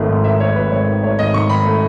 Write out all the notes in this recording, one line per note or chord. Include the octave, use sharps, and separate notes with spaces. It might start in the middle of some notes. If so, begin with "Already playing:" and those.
Already playing: G#1 D#3 A3
G#2
D#3 E5
A3 C#5
G#1 B4
G#2 C#5
D#3
A3 C#5
G#1 D#5
G#2 C#6
D#3 B5
A3